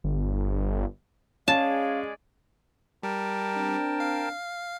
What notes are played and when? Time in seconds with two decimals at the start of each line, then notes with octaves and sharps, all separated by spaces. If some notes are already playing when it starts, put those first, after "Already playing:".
0.04 G1
1.48 G#3 C#4 G#4 D5 F5 A5
3.03 G3 A#4 G5 A5
3.56 C4 D4
4.00 F5